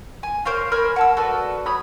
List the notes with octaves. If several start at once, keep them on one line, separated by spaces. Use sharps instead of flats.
G#5
A#4 C5 C#5 F5
A#4 C5 G#5 B5
F#5 A5 E6
F#4 A4 B4 D5
A3 C#5 B5 D#6